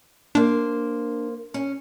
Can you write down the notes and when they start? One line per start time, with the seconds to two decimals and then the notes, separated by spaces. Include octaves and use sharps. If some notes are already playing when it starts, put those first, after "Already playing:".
0.35 A#3 D4 C5
1.54 C#4